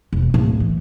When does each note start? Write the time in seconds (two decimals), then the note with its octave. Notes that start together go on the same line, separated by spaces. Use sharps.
0.13 E1
0.34 D1
0.60 E3